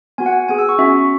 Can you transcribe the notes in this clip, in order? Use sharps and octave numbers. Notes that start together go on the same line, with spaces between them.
B3 F#4 G#5
F#5
G#5
B3 G#4 G#5
E6
C#6
C#4 F#4 E5